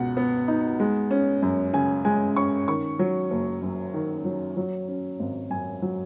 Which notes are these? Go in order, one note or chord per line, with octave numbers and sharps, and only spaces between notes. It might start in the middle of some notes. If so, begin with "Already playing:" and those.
Already playing: C#2 B2 F#5
B3
D#4
G#3
C#4
F#2
C#3 G#5
G#3 G#5
C#4 C#6
D#3 C#6
F#3
F#1
F#2
D#3
F#3
F#3
C#4
G#1
F#2 G#5
F#3